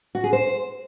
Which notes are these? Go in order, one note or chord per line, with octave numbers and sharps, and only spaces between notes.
F#4
G#4
C5